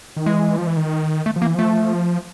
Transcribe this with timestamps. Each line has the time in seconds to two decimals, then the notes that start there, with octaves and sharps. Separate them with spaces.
0.16 D#3
0.26 E3 G#3
0.58 F3
0.67 E3
0.77 D#3
1.26 A3
1.36 F3
1.42 A#3
1.45 E3
1.55 F3 A3